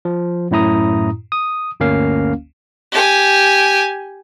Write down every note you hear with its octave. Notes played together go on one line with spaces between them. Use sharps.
F3
F#2 A2 E4 A#5 D#6
D#6
G1 D2 A#3 C#4 F5
G4 G#5